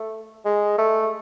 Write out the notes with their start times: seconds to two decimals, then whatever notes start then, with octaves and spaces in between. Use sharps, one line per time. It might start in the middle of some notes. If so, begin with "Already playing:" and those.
Already playing: A3
0.45 G#3
0.78 A3